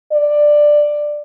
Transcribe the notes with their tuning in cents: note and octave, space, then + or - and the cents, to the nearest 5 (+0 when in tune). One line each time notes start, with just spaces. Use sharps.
D5 +10